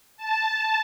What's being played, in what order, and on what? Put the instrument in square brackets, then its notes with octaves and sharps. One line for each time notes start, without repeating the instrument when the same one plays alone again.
[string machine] A5